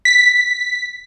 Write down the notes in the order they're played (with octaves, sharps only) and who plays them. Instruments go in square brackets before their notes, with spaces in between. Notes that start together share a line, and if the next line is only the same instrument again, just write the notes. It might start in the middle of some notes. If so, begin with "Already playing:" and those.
[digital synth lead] B6